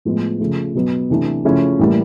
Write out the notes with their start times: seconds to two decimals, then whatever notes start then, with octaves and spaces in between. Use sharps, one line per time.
0.05 A2 F3 G#3 B3
0.40 C#3 F3 A3
0.74 B2 F#3 B3
1.10 C3 E3 A3 D4
1.45 C#3 F3 A3 C#4 E4
1.79 A2 E3 G3 A#3